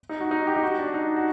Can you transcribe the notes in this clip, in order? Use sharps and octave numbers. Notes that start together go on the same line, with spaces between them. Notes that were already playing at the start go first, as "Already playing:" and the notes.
D#4
F#4
D#4
G4
D#4
F#4
D4
D#4
F#4